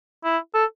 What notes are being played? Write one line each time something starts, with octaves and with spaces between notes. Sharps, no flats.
E4
A4